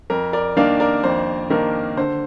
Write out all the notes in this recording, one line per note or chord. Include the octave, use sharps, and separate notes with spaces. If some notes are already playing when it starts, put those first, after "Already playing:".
F2 A#4
A#4 D5
D#3 A#3 D4 D5 F5
A#4 D5
F2 C5
D#3 A#3 D4 A#4
D3 C5